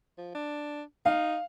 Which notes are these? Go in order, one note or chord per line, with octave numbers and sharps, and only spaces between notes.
F3
D4
D#4 F5